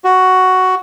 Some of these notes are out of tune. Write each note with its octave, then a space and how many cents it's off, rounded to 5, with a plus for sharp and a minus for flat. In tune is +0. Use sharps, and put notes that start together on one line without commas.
F#4 +5